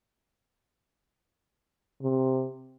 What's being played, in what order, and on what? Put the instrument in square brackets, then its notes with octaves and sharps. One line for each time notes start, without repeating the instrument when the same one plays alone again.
[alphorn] C3